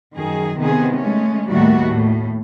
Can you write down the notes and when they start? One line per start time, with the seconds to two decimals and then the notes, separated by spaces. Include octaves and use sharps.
0.14 F#2 D#3 G#4
0.57 C3 D#3 B3 G#4
0.98 G#3 A3 C#4
1.49 D#2 A2 D#3 G3 A3 F#4
1.86 A2